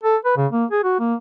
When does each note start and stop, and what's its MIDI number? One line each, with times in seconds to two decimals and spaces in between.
0.04 0.17 69
0.25 0.35 71
0.37 0.47 49
0.52 0.65 58
0.71 0.83 68
0.84 0.96 66
1.00 1.14 58